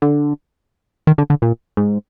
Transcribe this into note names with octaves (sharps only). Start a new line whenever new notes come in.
D3
D#3
D3
D3
A#2
G#2